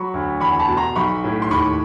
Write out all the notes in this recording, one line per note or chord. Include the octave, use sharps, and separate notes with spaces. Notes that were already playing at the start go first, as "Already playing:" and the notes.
Already playing: F#3 B5 C#6
D2
E2 B5 C#6
A5 B5
B2
A#5 C6
B1 B5 C#6
A2
C6
D#2 B5 C#6